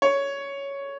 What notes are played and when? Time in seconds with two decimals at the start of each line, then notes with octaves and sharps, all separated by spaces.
0.02 C#5